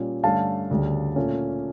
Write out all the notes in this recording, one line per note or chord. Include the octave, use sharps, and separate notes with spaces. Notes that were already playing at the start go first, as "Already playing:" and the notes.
Already playing: A#2 G3 C#4
G2 D3 A3 C#4 F5 A5
D2 C#3 G3
A#2 A3 C#4